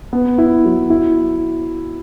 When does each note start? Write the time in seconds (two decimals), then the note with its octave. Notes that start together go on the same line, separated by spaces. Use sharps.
0.13 B3
0.38 E4
0.64 F#3
0.90 E4